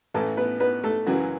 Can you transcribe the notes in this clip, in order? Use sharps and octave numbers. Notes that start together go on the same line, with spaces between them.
A1 A2 E3 A3 A4
B3 B4
B3 B4
A3 A4
F#2 C#3 E3 F#3 F#4